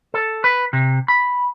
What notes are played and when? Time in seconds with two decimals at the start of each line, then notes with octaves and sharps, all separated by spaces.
0.14 A4
0.44 B4
0.73 C3
1.08 B5